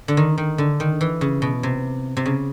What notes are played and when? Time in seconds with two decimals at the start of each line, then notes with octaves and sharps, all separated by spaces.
0.08 D3
0.17 D#3
0.38 D#3
0.58 D3
0.80 D#3
1.01 E3
1.21 C#3
1.42 B2
1.63 C3
2.17 C3
2.26 C#3